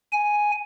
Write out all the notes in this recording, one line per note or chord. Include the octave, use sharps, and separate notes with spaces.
G#5